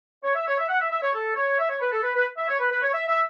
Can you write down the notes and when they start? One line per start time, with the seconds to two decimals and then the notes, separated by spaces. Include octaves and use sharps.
0.24 C#5
0.35 E5
0.46 C#5
0.58 E5
0.68 F#5
0.80 E5
0.91 E5
1.02 C#5
1.14 A4
1.35 C#5
1.58 E5
1.69 C#5
1.80 B4
1.92 A4
2.03 B4
2.14 B4
2.37 E5
2.48 C#5
2.59 B4
2.71 B4
2.82 C#5
2.93 E5
3.08 E5